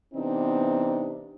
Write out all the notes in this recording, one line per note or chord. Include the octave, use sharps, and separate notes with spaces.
C3 E3 B3 C4 D4 D#4